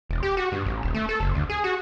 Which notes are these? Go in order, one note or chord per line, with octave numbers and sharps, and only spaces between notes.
E1
G4
F#4
G2
A1
D#1
A3
A4
F#1
D2
G#4
F#4